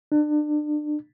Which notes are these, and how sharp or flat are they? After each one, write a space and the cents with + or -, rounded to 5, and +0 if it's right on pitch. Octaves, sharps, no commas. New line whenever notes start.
D4 +30